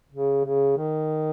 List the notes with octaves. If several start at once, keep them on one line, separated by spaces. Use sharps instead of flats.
C#3
C#3
D#3